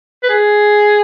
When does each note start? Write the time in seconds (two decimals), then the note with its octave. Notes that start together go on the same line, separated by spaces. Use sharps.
0.23 B4
0.29 G#4